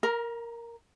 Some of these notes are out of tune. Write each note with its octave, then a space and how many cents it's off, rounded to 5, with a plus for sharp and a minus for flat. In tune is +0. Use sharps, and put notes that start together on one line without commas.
A#4 +0 A#5 +35